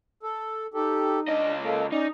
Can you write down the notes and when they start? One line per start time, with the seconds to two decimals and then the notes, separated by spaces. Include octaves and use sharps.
0.23 A4
0.74 D#4 G4 A4
1.28 C#2 D4 D#5
1.62 A#3 A4
1.92 C#4 D#4 D5